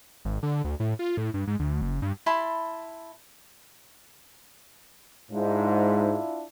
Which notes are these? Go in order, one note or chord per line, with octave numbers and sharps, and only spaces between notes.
G#1
D3
D2
A2
F4
A2
G2
G#2
D2
F#1
G2
E4 A5 B5 C6
G#2 D4 E4 F4